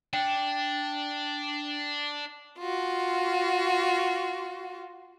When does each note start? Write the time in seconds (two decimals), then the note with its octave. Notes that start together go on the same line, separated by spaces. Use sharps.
0.13 D4 G5
2.60 F4 F#4